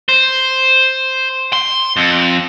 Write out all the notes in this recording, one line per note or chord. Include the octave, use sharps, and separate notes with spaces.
C5
C6
F2